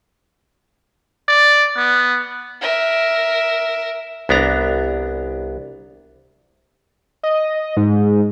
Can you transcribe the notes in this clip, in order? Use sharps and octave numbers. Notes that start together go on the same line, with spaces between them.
D5
B3
A#4 E5
C2 B3 D4 A#5
D#5
G#2